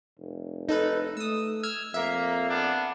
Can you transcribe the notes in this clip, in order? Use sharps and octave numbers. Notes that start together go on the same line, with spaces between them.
F1
D#4 A4 B4
A3 D#6 E6
E6 F6 G#6
F2 A#3 E5
B3 D4